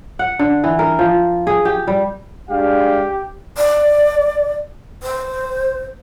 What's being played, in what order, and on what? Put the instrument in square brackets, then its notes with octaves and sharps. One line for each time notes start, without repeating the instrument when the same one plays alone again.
[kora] F#5
D3
E3
A#4
F3
G#4
G4
G3
[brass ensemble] G#3 D4 F5 [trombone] G4
[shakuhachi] D5
C5